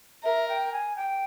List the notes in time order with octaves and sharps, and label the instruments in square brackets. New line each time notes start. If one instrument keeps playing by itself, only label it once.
[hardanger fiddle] A#4 [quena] E5
[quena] G5
G#5
G5